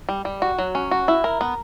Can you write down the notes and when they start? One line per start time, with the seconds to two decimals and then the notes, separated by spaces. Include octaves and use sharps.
0.09 G3
0.25 G3
0.42 F#4
0.58 F#3
0.75 C#4
0.91 F#4
1.08 E4
1.24 A#4
1.41 B3